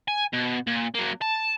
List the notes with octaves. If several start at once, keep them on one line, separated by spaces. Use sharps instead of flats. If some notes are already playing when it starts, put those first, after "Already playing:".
G#5
B2
A#2
F#3 A#3
A5